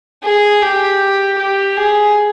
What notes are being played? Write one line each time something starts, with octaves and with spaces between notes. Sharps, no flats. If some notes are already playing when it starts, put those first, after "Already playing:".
G#4
G4
G4
G#4